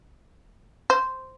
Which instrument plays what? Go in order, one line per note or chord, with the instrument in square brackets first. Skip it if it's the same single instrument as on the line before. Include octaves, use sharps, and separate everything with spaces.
[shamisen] C5